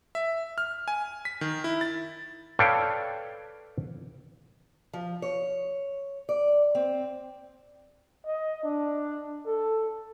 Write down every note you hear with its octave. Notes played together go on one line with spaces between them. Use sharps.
E5
F6
G#5
B6
D#3
E4
A6
A4 B4 C#5 D5 F5 G5
F3
C#5
D5
C4
D#5
D4
A4